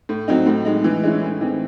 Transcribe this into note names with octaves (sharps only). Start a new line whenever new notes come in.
A2
F#3 C4 D#4
A2
G#3 D#4
E3
G#3 C#4 E4
A2
E3 C4 D#4